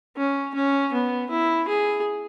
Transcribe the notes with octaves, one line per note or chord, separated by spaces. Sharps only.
C#4
C#4
B3
E4
G#4